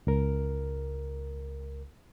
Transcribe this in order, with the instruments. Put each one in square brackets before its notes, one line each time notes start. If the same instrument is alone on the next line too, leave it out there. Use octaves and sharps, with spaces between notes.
[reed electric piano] C#2 A#4